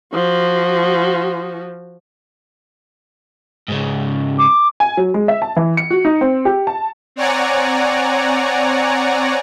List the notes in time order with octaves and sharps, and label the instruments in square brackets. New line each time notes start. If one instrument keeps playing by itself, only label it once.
[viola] F3 F#4
[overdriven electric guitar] G#2 C#3
[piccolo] D6
[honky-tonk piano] G#5
F#3
G#3
E5
A5
E3
C#7
F#4
D#4
C4
G4
A5
[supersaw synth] C4 C#5 D5 F#5 G#5 A#5